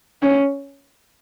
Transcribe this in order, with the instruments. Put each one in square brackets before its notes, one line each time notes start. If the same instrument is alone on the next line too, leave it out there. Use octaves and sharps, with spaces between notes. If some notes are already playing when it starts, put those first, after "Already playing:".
[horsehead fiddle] C#4